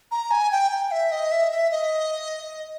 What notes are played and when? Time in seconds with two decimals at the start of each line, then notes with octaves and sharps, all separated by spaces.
0.11 A#5
0.31 G#5
0.51 G5
0.71 G5
0.91 E5
1.12 D#5
1.31 E5
1.52 E5
1.71 D#5